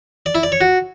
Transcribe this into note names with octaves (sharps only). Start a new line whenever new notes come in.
D5
E4
D5
C#5
F#4